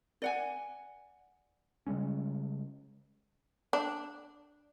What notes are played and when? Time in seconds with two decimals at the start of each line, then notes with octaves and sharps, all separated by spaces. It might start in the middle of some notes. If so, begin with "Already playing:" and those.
0.22 D5 F#5 G#5
1.87 C#3 G3 G#3 C#4
3.73 D4